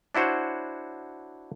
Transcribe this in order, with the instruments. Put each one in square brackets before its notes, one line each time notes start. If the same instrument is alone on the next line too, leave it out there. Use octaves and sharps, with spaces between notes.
[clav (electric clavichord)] D4 E4 F#4 C5 C#5